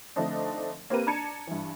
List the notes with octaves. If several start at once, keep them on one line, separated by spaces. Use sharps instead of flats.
D3 F3 A3 C4 D4 D#4
A#3 C4 G4 A#4 B4 D#7
D4 A5 A#5 G#6 C#7
G2 E3